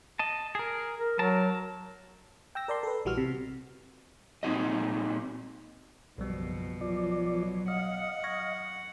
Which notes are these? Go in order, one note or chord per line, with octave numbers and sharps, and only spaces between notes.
D#5 A5
G#4 A#4
A#4
F#3 A#4 A5
G5 E6 A#6
A#4 D5 A5 C6
A4 B4
A#1 E3 G3 F#4 E6 F6
C3
A#2 C4 D#4 F#4 D#5
F#1 B1 B2 F3 G3
F3 F#3 D5
D#5 F5 F#5
C#6 G#6 A#6